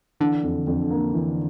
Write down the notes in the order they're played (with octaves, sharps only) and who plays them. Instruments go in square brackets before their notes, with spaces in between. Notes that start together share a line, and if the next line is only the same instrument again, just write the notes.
[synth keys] D3 [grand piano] E3
[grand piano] F2
F2
A#3
E3